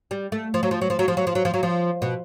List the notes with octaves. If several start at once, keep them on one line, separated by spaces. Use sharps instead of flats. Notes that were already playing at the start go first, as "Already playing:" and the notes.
G3
A3
F3
F#3
F3
F#3
F3
F#3
F3
F#3
F3
F#3
F3
F#3
F3
B2